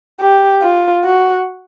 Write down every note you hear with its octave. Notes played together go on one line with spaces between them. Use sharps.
G4
F4
F#4